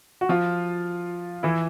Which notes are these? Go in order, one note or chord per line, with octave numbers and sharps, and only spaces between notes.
F#4
F3 F4
E3 E4